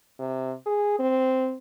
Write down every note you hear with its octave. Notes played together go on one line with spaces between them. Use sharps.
C3
G#4
C4